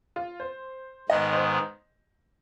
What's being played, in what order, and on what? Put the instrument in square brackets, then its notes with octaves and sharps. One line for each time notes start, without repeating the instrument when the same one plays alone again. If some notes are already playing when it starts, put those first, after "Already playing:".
[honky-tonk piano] F4
C5
[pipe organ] G#2 D#3 B3 [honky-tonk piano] D#5
[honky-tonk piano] C5